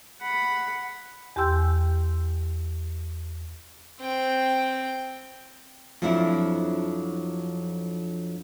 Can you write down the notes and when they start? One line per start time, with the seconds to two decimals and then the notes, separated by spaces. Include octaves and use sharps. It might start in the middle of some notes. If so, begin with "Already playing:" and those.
0.21 F#5 B5
1.36 E2 G4 G5 C6 E6 G6
4.01 C4 G5
6.02 F2 F3 F#3 D4 E4 E5